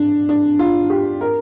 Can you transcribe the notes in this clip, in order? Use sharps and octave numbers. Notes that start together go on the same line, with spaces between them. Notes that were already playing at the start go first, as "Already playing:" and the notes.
Already playing: D4
D4
F4
G4
A#4